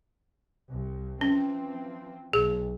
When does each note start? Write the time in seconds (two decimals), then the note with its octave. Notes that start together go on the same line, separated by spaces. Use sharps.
0.69 C2
1.21 E3 F3 C4 C#4
2.33 B1 G#4